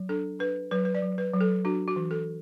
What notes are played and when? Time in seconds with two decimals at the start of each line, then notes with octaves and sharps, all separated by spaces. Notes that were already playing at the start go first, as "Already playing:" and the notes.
Already playing: F#3
0.09 D4 A4
0.39 D4 B4
0.71 F#3 B4
0.85 B4
0.95 D5
1.02 F#3
1.18 B4
1.33 F#3
1.41 A4
1.65 D4 F#4
1.88 F#4
1.96 E3
2.11 A4